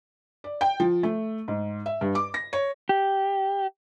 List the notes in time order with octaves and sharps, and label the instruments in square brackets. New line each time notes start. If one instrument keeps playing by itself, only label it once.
[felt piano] D5
G5
F3
A3
G#2
E5
G2
D6
A#6
C#5
[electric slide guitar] G4